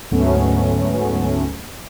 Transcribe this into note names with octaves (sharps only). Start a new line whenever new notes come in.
D2 G#2 F#3 A3 B3 C#4